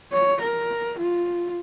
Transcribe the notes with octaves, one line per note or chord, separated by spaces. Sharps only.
C#5
A#4
F4